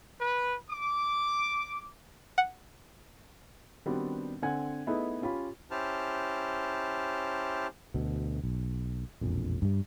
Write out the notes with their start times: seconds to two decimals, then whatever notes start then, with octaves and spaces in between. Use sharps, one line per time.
0.19 B4
0.69 D6
2.38 F#5
3.86 D#3 G3 B3 C4 D4 F#4
4.42 D3 C4 F#5 G#5 G#6
4.87 A3 B3 D#4 E4 G#4 B4
5.22 C#4 F4 G4 B5
5.71 C#4 E4 G4 C5 A5 F6
7.94 D2 B2
8.44 B1
9.21 E1 A#1 F2
9.62 G2 G3